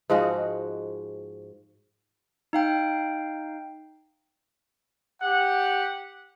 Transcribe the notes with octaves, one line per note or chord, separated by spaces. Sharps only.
G#2 F3 G#3 F#4
D#4 F5 G5
G4 F#5